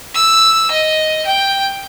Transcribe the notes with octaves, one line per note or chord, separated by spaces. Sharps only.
E6
D#5
G5